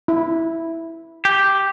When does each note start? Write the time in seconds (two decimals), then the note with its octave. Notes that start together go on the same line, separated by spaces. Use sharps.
0.08 E4
1.25 G4